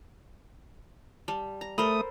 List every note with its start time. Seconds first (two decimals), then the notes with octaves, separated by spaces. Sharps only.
1.28 G3 A5
1.61 A#5
1.78 A3 A4 A#4 C5 B5 D#6